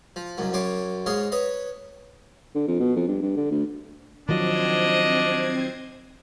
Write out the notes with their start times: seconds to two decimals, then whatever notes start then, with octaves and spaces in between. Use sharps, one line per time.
0.16 F3
0.38 C2 F#2 F#3
0.53 F#2 C#5 C6 D6
1.06 G#2 C#5 D#5 F5 C6
1.32 B4 C#5 D#5
2.55 D3
2.67 F2
2.80 B2
2.96 F2
3.07 G2
3.22 G2
3.37 D3
3.51 D2
4.29 D#3 F3 F#3 C4 D4 C5 D#5 G#6